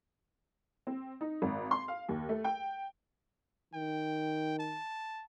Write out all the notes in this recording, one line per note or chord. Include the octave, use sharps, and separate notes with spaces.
C4
D#4
G#1
C6
F5
D#2
A3
G5
D#3 G5
A5